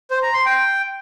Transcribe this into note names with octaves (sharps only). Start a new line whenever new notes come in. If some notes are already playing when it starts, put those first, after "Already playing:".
C5
A#5
C6
G5